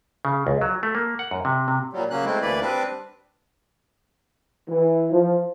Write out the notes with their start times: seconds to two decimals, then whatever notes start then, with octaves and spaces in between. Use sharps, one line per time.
0.25 C#3
0.47 C#2
0.61 F#3
0.83 A3
0.95 A#3
1.19 F#5
1.31 F#2
1.45 C3
1.68 C3
1.93 A#2 F#3 G3
2.10 C#3 F#3 A#3 C#4 F#6
2.25 G#3 A3 C4 E4
2.42 D2 E3 A#3 B4 D5 B5
2.61 G3 C4 D4 B4 D6
4.68 E3
5.12 F3